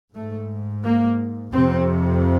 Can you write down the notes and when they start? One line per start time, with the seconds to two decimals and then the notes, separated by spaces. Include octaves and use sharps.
0.14 G#2 A3
0.83 A#3
1.53 F2 C3 C4